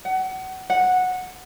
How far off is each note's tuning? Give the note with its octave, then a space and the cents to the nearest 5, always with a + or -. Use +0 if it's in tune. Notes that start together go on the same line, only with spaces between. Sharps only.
F#5 +25
F#5 -10